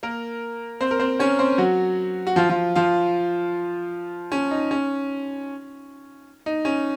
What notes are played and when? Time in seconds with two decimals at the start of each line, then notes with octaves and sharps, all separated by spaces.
0.03 A#3 A#4
0.81 C4 C5
0.91 A#4
1.00 C4 C5
1.19 C#4 C#5
1.39 C4 C5
1.58 F#3 F#4
2.27 F#4
2.36 F3 F4
2.49 F3 F4
2.75 F3 F4
4.32 C#4
4.51 D#4
4.71 C#4
6.46 D#4
6.65 C#4